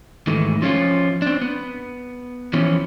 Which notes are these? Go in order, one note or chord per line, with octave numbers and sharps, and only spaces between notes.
G#2 D#3 E3 A3
F3 C#4 F4
C4 D4
B3
E3 F3 C#4